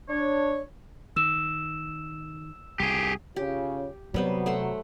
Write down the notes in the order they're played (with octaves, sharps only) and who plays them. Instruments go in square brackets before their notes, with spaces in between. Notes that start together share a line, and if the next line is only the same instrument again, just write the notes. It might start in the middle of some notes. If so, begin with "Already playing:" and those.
[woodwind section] D4 C#5
[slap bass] D#3 [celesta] E6 E7
[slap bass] C2 [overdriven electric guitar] G4 G#4
[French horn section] C#3 F4 C#5 [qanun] G4
[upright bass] C3 [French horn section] F#3 [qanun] G3 B3 C5
[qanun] A3 F#5 C6